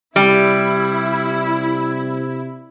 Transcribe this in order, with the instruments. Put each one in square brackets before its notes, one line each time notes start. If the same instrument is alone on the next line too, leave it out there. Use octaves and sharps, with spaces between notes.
[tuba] C3 [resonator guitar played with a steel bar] G3 [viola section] E4